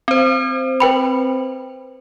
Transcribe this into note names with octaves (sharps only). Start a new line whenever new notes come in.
C4 C5
B4 G5 B5